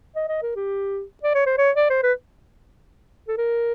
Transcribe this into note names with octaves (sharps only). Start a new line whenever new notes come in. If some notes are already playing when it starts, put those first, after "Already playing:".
D#5
D#5
A#4
G4
D5
C#5
C5
C#5
D5
C5
B4
A4
A#4